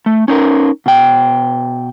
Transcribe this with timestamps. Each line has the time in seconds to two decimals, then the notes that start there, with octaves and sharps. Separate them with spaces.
0.06 A3
0.28 C#4 D#4 A#4
0.86 B2 G5